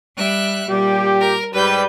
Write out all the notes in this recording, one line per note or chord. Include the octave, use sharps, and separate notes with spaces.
G3 E5 F#6
A#2 G3 G4
A#4
G#2 G3 B4 G6